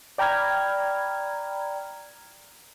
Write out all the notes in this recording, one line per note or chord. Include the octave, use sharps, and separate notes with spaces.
D5 G5 A#5 B5 F6 G#6